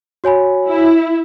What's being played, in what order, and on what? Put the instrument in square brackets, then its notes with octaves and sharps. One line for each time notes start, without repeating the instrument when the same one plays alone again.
[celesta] F#4 C#5 G#5 B5
[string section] E4